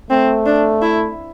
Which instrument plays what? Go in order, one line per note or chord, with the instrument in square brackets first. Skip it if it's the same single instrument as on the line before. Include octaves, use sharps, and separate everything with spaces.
[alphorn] A3 [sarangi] C4
[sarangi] D4
E4